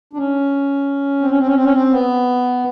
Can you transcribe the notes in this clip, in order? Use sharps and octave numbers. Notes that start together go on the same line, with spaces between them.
D4
C#4
C4
C#4
C4
C#4
C4
C#4
C4
B3